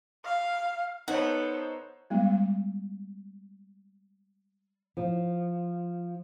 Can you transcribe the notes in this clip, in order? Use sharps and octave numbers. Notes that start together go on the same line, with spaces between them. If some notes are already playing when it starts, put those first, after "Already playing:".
F5
B3 D#4 A4 C5 C#5 F#5
G3 G#3 B3
F3